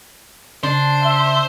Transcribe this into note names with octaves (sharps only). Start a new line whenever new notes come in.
C#3 D4 C5
E5